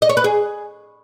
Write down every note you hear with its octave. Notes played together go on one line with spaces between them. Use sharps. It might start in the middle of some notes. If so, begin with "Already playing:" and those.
D#5
C#5
B4
G#4